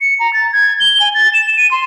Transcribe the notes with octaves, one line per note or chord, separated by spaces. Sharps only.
C#7
A#5
A6
G#6
G7
G#5
A6
E7
D#7
C6